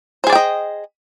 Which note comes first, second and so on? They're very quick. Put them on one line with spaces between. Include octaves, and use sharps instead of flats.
C5 G#4 D5 G5 D#5